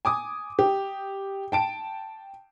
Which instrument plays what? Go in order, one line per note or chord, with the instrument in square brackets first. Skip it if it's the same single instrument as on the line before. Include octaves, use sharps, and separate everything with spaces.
[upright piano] G#5 D6 D#6
G4
G5 A5 D7